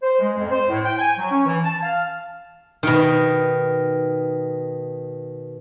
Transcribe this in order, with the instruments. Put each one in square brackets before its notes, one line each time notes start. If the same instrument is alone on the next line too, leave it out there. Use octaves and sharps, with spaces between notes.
[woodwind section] C5
G#3
F2
C5
A2
G5
G#5
F#3
C#4
E3
A5
F5
[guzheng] B2 D#3